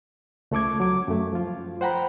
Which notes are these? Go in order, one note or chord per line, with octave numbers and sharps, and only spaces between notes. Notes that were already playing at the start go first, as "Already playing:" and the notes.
C#2 A3 A4 D6 G#6
F#3 D6
F#2 A3
F3 F4
C5 F#5 G5 A#5 B5